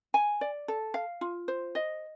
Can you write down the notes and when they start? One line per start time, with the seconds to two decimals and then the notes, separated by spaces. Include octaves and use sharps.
0.14 G#5
0.41 D5
0.68 A4
0.94 F5
1.21 F4
1.48 C5
1.75 D#5